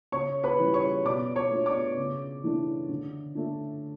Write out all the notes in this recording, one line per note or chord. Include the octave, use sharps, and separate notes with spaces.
C#3 C#5 C#6
B4 B5
E3 G3 C#4
C#5 C#6
B2 D5 D6
C#5 C#6
A3 D4
D5 D6
C#3
E3 A3 D4
D3
A3 D4